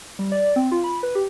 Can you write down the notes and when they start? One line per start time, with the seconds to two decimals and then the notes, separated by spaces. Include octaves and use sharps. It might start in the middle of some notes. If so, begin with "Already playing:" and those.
0.19 G3
0.32 D5
0.56 C4
0.72 F4
0.84 B5
1.03 B4
1.15 G4